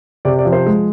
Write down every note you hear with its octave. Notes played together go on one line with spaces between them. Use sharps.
C3 D5
D5
F3
C5
G#3